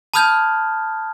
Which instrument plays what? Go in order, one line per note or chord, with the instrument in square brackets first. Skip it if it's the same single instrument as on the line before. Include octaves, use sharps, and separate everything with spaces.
[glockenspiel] A5 B5 D#6 F6 G6 G#6